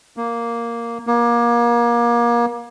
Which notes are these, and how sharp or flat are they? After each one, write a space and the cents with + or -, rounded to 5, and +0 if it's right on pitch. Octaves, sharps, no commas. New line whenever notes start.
A#3 +0
A#3 +30